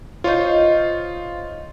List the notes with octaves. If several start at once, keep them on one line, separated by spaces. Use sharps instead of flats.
D#4 F4 C5 C#5